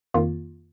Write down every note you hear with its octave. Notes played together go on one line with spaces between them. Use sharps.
F2 D#3 A#3 F4